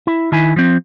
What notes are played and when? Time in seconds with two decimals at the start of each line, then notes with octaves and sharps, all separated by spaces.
0.07 E4
0.32 D#3 E4 G#5
0.56 F3 C4